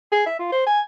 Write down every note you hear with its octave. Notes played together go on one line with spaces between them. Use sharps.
G#4
E5
F4
C5
G#5